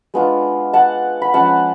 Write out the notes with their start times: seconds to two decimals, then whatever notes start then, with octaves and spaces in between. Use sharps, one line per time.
0.14 G#3 B3 D4 F4
0.73 F#5 A5
1.22 B5
1.33 F3 G#3 C#4 F#5 A5